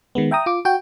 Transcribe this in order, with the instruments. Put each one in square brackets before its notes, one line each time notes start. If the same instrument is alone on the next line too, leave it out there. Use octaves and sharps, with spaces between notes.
[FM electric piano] D#3 G#3 B3
E5 G5 A#5 D#6
F4 D6
F#4 G5